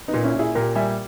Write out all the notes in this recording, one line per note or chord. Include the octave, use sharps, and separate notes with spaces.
B3 D#4
A#2
C#4 E4
A#2
E4 G#4
A#2 G4 A#4
G3 E5 G#5